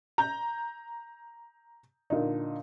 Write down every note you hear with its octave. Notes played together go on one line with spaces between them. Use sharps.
A#5 G6
A#2 D3 D#4